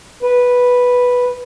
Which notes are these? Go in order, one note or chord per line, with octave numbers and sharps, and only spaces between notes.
B4